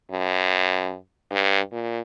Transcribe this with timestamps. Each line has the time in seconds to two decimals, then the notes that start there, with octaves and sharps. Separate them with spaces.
0.11 F#2
1.32 G2
1.72 A#2